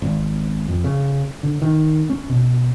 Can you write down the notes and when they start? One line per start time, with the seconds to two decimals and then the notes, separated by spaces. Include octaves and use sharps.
0.02 G#1
0.68 F2
0.84 C#3
1.43 D3
1.62 D#3
2.10 C#4
2.29 B2